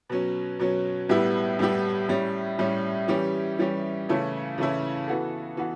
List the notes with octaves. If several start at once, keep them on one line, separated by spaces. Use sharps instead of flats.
B2 F#3 C#4
B2 F#3 C#4
A2 G3 B3 E4 G4
A2 G3 B3 E4 G4
A2 G3 C#4
A2 G3 C#4
E3 G3 C#4 G4
E3 G3 C#4 G4
C#3 E3 A3 C#4 E4
C#3 E3 A3 C#4 E4
E3 B3 F#4 A4
E3 B3 F#4